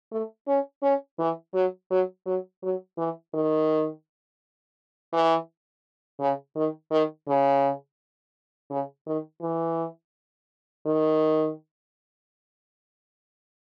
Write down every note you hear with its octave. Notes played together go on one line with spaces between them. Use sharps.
A3
C#4
C#4
E3
F#3
F#3
F#3
F#3
E3
D#3
E3
C#3
D#3
D#3
C#3
C#3
D#3
E3
D#3